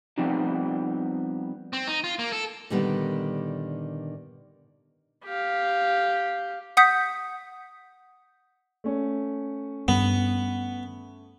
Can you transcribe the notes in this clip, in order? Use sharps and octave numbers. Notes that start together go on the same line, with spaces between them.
F3 G3 B3 C4 D#4
C4
D#4
F4
A#3
A4
A#2 D3 D#3 G3 B3
G4 F5
F#5 D#6 G6 B6
A3 C#4
G2 B3